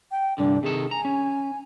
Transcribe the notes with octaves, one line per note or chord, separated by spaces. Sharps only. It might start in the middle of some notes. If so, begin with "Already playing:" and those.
G5
C2 G2 D3 D4
C3 D#3 G#4 A4
G#5 A#5
C#4